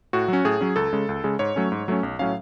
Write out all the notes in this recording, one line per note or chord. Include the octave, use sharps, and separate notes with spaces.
A2 F#4
F#3 C#4
A2 G#4
F#3 C#4
C#2 A4
C#3 G#3
C#2
C#3 G#3
G#2 C#5
F#3 A3 C#4
G#2
F#3 A3 C#4
B1
A2 F#3 C#4 F5